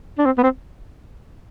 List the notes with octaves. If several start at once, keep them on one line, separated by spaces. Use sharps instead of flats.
D4
C4
B3
C4